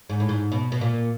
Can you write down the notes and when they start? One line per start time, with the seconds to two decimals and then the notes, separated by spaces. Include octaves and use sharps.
0.09 G#2
0.20 A2
0.29 G#2
0.52 B2
0.72 B2
0.81 A#2